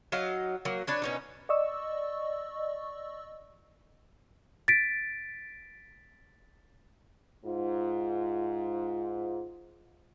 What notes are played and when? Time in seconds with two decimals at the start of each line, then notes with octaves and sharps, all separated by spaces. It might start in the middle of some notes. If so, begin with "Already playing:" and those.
0.12 F#3 D#4 D#5 F5
0.65 F#3 A#3
0.87 D4 B4 C#5
1.02 B2 C#4 D#4
1.49 D5 D#5 C#6 E6
4.68 A6 B6 D7
7.45 G#2 F4